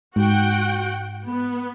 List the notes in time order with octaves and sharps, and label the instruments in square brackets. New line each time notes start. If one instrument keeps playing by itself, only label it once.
[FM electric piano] G#2 [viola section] F#4 F#5 G5
[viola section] B3